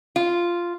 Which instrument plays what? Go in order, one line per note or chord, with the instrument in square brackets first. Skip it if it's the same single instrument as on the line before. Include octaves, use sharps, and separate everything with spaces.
[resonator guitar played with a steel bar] F4